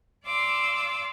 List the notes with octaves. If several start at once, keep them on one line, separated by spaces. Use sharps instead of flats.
D5 F5 C6 D6 E6